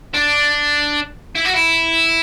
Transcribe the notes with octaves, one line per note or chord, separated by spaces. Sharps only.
D4
E4
F#4
E4